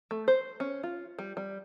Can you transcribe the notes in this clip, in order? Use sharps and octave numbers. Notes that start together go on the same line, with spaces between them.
A3
C5
C#4
F4
G3
G3